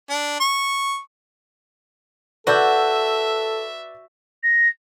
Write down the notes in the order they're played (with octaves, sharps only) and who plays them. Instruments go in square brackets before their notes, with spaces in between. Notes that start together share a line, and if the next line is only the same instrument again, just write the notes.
[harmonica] D4
C#6
[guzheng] F#4 [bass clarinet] A4 [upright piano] B4 D5 G6 [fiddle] E5
[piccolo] A#6